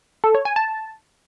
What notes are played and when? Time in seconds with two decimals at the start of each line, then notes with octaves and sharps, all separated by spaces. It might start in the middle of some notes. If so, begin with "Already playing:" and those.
0.24 A4
0.35 C#5
0.45 G#5
0.56 A5